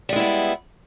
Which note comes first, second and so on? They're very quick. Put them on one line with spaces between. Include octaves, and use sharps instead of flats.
G3 G#3 E4 B3